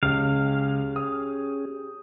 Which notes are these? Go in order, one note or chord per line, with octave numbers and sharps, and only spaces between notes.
C#2 C#4 G4 G#4 F5
D#6